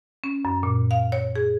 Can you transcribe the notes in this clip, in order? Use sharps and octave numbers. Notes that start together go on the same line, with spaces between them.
C#4
F#2
A#2
F5
C#5
G#4